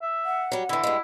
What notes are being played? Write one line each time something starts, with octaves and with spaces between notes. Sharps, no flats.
E5
F#5
F#3 G3
D3 E3 E4
G2 G#3